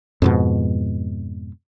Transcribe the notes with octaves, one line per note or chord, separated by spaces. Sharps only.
F2 G#2 B2